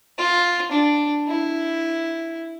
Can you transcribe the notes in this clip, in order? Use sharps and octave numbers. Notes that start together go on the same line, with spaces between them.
F4
D4
E4